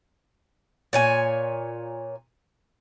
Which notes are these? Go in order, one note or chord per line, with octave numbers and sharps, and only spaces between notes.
A#2 C#5 G#5